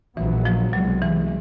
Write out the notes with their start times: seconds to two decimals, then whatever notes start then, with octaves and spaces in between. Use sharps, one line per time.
0.17 A#1 A#2 E3 F#3 B3
0.45 F3
0.73 C2 B2 F#3 G#3
1.02 E3